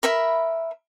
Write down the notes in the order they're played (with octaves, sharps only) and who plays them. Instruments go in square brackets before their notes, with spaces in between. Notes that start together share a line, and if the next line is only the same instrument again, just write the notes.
[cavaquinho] A#4 E5 B5